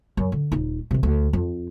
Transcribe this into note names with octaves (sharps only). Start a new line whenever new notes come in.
F#2
D3
D#1 D#4
C3 D#3
D2
F2